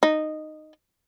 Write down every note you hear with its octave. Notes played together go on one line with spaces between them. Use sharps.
D#4